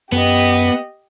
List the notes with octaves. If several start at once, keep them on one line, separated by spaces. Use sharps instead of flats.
F#2 B3 G4 D#5